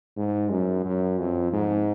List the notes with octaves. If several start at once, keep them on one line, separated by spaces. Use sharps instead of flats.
G#2
F#2
F#2
F2
G#2